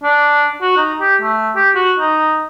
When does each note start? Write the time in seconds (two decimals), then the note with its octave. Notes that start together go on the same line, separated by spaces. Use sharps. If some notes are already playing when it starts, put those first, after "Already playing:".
0.03 D4
0.62 F#4
0.77 D#4
1.00 G4
1.22 A3
1.56 G4
1.75 F#4
1.99 D#4